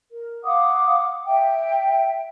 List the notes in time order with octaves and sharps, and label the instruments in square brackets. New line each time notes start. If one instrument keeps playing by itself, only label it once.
[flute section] A#4
F5 F#5 D6 D#6
E5 G5